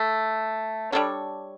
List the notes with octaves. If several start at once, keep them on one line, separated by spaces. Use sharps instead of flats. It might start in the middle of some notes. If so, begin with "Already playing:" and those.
Already playing: A3
G3 D4 A4 C#5